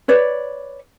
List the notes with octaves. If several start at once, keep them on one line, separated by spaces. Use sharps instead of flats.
B4 C#5 D5